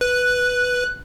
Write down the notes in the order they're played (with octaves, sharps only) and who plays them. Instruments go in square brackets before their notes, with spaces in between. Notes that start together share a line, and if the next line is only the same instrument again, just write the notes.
[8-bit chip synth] B4 [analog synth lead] F#6